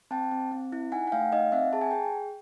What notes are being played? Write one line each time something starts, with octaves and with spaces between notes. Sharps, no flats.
C4 G5 A5
C4
C4
E4
D#4 F#5 G#5
F#5
A3 F5 G5
D#4 D#5 F5
C4 E5 F#5
G#4 A5
G#5
G#4 G5